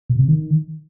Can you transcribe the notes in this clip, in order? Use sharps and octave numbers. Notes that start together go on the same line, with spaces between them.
B2
C3
D#3